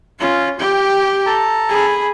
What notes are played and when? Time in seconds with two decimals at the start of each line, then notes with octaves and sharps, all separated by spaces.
0.20 C#4 F4
0.59 G4 G5
1.26 A4 A5 A#5
1.69 G#4 B5